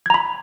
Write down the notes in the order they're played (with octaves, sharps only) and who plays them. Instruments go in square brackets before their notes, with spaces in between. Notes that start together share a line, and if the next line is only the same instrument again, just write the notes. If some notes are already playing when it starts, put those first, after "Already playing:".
[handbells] G#6
A#5
B5